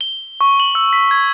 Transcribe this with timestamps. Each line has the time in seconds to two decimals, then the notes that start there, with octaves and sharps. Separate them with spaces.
0.01 G7
0.41 C#6
0.60 F#7
0.75 E6
0.93 B6
1.11 G#6